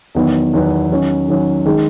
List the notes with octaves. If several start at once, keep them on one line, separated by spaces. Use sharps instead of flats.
E2 D#3 F#3 B3
E2 D#3 F#3 B3
D#3 F#3 C#4
D#3 F#3 C#4
D#3 G#3